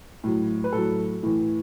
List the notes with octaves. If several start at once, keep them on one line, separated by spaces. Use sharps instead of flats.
A2 F#3
B4
A2 F#3 A4
A2 E3